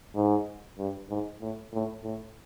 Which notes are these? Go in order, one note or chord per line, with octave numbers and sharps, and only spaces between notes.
G#2
G2
G#2
A2
A2
A2